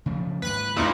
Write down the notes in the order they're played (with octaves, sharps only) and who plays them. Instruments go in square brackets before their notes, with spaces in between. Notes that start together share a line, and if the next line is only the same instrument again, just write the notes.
[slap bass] C#3 F3 A3
[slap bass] D#2 G#2 [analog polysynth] B4 F#6
[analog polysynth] D2 D#4 E4 [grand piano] A#2